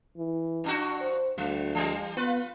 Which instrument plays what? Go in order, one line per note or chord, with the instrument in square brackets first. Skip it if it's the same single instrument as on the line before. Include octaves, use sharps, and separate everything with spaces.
[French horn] E3
[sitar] G2 D4 F#4
[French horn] C5
[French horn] D2 [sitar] F#3
[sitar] E3 G3
[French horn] B3 [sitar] F4 B4